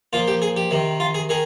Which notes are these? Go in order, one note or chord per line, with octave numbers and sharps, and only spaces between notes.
A#2 F3 F4
G4
G#4
G4
C3 D#3
F4
G#4
D#3 G#4